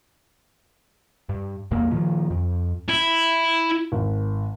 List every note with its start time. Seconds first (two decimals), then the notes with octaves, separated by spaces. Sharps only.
1.29 G2
1.71 A#1 E2 A#2 A#3
1.91 A#2 D#3 F3
2.30 F2
2.89 E4
3.92 G#1